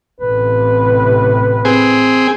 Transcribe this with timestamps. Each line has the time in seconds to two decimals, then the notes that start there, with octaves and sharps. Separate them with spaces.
0.20 A1 A2 C3 B4
1.65 C4 G#4